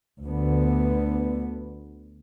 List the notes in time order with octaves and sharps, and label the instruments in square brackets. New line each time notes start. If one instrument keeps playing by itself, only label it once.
[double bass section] D2 D3 B3